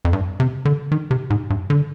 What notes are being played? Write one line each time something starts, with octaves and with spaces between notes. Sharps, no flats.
F2
G2
C3
D3
D#3
C3
G#2
G2
D3